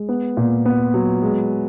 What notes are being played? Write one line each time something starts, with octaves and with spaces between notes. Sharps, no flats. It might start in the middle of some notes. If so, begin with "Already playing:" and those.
Already playing: G#3
B3
A#2
B3
F#3
G#3